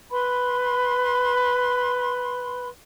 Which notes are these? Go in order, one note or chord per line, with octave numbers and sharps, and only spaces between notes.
B4 B5 C6